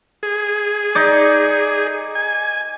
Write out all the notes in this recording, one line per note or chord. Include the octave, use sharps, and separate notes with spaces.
G#4
D#4 D5
G#5